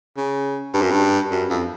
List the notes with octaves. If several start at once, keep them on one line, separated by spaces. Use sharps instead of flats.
C#3
G2
F#2
G2
F#2
F2